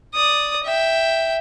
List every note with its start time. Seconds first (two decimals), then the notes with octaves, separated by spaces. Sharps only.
0.14 D5 D#6
0.64 E5 G5